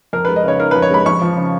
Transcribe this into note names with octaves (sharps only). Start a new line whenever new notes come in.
F2 A#4
G#3 B4
D#5
C#3 C#5
D#4 A#4
F2 B4
C#5
G#3 B5
F2 C#6
F3
C#3